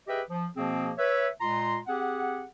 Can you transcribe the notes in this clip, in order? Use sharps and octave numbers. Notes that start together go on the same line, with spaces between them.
G4 G#4 B4 D#5 E5 G5
F3
B2 F3 A#3 C4 G#4
B4 C#5 E5
A#2 G#3 F4 A#5 C6
C4 G4 G#4 F#5